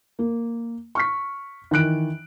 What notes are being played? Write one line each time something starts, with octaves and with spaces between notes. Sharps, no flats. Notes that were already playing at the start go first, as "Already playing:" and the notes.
A#3
C#6 F6 B6
D#3 E3 F#6 D7